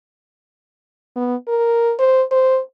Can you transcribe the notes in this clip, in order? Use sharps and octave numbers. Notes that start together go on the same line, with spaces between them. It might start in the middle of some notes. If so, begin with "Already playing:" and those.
B3
A#4
C5
C5